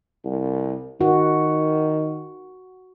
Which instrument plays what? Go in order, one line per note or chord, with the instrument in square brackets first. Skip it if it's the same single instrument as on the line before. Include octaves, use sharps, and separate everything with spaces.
[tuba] C2
[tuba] D#3 [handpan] F#4